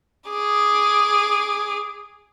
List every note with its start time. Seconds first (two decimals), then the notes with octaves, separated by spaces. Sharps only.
0.30 G#4 D6